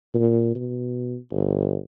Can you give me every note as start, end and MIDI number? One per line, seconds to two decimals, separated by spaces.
0.15 0.51 46
0.55 1.16 47
1.31 1.77 31